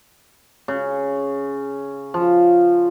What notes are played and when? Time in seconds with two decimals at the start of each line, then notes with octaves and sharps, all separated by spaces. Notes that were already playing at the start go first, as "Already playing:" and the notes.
0.68 C#3
2.14 F3